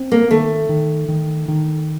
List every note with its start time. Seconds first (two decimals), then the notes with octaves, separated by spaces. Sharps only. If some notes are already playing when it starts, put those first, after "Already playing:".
Already playing: C4
0.12 A#3
0.30 D#3 A3
0.69 D#3
1.08 D#3
1.48 D#3